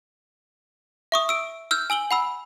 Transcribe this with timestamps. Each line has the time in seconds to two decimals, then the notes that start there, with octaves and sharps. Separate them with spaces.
1.12 E5 C#6 D#6
1.29 E6 D7
1.71 E6 F6 G6
1.90 G#5 E6 F#7 G7
2.11 F#5 B5 E6